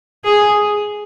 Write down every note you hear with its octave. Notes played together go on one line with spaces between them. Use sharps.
G#4